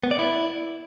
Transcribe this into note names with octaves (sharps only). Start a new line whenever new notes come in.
B3
D5
E4